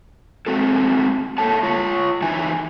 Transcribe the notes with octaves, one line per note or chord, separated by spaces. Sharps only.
G#3 A3 C4 F#4 A4
A3 A#3 A4 C#5 A5
F4 C#5
F#2 E3 F#3 D#4 E5 G#5